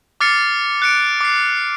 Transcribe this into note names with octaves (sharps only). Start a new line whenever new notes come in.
D6 F6 A6 C7 C#7
F#6 C#7 D7
D6 C7